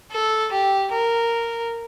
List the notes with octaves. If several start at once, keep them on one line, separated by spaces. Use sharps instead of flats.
A4
G4
A#4